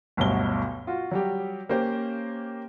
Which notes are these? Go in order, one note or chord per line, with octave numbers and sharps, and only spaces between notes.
G1 D2 G2 B2 F#3 G7
F4 F#4
F#3 G3 G4
A#3 C#4 G4 C5